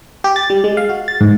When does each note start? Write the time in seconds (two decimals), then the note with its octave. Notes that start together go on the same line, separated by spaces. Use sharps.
0.24 G4
0.36 A6
0.50 G3
0.64 G#3
0.77 F5
0.89 F#4
1.08 A6
1.21 G#2